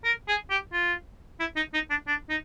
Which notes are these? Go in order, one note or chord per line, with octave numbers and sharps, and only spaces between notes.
A#4
G#4
G4
F4
E4
D#4
D#4
D4
D4
D#4